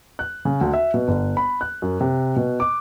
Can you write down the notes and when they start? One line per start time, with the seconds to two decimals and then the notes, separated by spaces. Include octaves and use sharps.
0.19 F#6
0.45 C#3
0.61 D2
0.74 E5
0.94 B2
1.08 G1
1.37 B5
1.61 F#6
1.82 F#2
2.01 C3
2.36 B2
2.60 D6